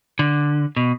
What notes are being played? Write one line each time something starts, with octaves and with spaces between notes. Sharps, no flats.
D3
B2